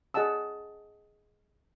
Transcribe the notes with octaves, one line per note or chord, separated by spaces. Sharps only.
G#4 D#5 F#5 A5 E6